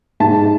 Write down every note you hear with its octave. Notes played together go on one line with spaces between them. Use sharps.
G#2 A5